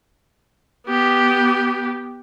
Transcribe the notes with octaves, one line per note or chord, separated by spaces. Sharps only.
B3 G4